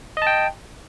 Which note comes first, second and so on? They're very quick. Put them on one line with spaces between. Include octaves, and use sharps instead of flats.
D#5 A5 G5